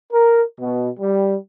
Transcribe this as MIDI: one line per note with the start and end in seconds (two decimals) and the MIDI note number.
0.12 0.42 70
0.59 0.90 47
0.99 1.35 55